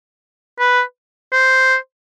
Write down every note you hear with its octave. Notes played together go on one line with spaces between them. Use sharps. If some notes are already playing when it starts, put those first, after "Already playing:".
B4
C5